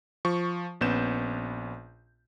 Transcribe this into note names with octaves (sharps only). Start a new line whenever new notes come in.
F3 C#6
A#1 B3 C#4 G6 E7